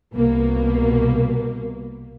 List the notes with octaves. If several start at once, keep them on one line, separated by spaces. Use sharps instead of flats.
C2 B2 A#3